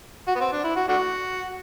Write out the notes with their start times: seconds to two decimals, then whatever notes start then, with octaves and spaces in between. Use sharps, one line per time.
0.28 F#4
0.35 B3
0.40 C4
0.52 D4
0.64 E4
0.76 F#4
0.88 A3 D4 F#4